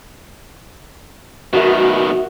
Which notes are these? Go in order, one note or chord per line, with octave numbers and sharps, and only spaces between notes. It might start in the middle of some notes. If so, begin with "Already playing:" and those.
B2 D#3 F#4 A#4 E5